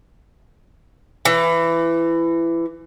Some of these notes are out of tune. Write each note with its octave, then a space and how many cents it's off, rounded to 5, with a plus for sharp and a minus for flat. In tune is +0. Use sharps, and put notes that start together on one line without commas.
E3 +20